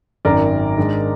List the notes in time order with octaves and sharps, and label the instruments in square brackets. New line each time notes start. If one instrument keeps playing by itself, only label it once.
[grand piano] G#1 F#2 D#3 [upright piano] A#4 D5
[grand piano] G#2 D#3 G#3 D4